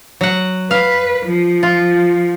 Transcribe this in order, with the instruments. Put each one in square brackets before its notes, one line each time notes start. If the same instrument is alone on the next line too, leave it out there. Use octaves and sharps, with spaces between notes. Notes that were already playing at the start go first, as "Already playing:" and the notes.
[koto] F#3 F#5
[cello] B4 [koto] F5
[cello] F3
[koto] F4